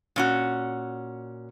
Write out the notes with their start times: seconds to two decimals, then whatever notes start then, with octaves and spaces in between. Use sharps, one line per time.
0.16 A#2 C#4 F#4